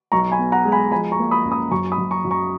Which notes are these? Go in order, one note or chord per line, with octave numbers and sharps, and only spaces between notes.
B1 A#5 C#6
G#5 B5
B3
F#5 A#5
G#3
G#5 B5
F3 G#5 B5
A#5 C#6
A#3
B5 D#6
F#1
B5 D#6
F#2 A#5 C#6
B5 D#6
F#2
A#5 C#6
F#2
A#5 C#6